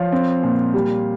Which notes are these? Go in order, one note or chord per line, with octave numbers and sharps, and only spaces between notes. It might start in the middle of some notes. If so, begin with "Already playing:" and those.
Already playing: F3 C#5 F5
C4
A#2
G3